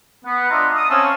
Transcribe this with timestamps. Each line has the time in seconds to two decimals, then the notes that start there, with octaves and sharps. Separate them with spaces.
0.24 B3
0.50 D4 F4 D#5 E5 A#5 C6
0.75 D#6
0.90 C4 C#4 C#5 F5 A5 E6